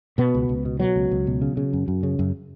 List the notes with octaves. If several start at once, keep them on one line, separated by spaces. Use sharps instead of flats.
B2 B3
C#2
C#2
B2
B2 F#3
C#2
C#2
B2
C#3
C#3
F#2
F#2
C#3
F#2